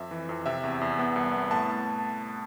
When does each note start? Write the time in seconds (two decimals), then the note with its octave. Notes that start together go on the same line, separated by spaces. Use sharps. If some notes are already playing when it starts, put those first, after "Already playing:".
Already playing: F2 E5
0.11 E3
0.29 F2
0.46 C3 E5
0.64 E2
0.81 E2
0.99 B3
1.16 C2
1.34 B3
1.51 A2 A5